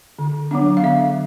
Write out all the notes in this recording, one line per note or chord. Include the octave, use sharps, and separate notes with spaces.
D3
F#3 B3 D4
F5
D3 E5